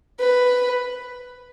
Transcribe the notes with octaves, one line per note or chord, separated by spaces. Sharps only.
B4